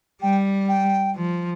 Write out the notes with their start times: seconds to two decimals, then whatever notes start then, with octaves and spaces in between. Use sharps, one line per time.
0.22 G3 G5
0.69 G5
1.15 F3